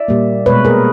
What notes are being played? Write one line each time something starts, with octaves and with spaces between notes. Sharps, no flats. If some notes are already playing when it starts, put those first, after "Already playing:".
Already playing: D5 E5
A#2 G3 A#3
B2 G#3 B4 C#5
G#4 A#4